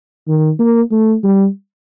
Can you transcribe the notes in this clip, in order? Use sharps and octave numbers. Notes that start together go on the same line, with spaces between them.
D#3
A#3
A3
G3